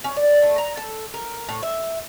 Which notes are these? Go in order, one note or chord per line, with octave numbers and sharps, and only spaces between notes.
C#4
D5
A3
A#5
A4
A#4
A2
E5